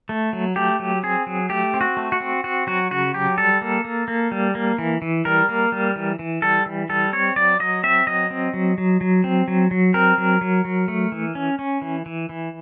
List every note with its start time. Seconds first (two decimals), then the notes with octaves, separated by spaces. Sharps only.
0.09 A3
0.33 F#3
0.56 A3 G4
0.79 F#3
1.03 C4 G#4
1.27 F#3
1.50 A3 G4
1.74 C4
1.81 F#4
1.97 A3
2.12 F#4
2.20 C4
2.44 C4 F#4
2.67 F#3 F#4
2.91 C#3 F#4
3.14 F#3 G4
3.37 G3 A4
3.62 A#3
3.85 A#3
4.08 A#3
4.31 G3
4.55 A#3
4.79 E3
5.02 E3
5.25 G3 A#4
5.49 A#3
5.72 G3
5.96 E3
6.19 E3
6.42 G3 A4
6.66 E3
6.89 G3 A4
7.13 C4 C#5
7.36 F#3 D5
7.60 F#3 D#5
7.83 C4 E5
8.07 F#3 D#5
8.30 C4
8.54 F#3
8.78 F#3
9.01 F#3
9.24 C4
9.48 F#3
9.71 F#3
9.94 C4 A#4
10.18 F#3
10.41 F#3
10.65 F#3
10.88 A3
11.12 E3
11.35 C#4
11.59 C#4
11.82 E3
12.06 E3
12.29 E3